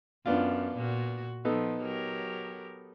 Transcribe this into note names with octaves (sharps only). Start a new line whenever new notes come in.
F#2 B3 D4 F4
A#2 F#4
F3 B3 D#4 A4
F#3 G4 A#4